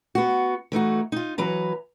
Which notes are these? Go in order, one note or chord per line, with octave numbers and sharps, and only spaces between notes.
B3 F#4
E3 A3 D#4 F#4
D#4 F4
E3 F#3 B4 A#5